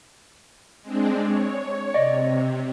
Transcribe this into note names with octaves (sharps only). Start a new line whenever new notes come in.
G#3 C4 D4
C#5
C3 D5 D#5